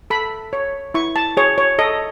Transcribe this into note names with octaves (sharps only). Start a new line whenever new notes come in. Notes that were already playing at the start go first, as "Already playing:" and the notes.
A4 B5
C#5
E4 C#6
A5
G#4 C#5
C#5
A4 D#5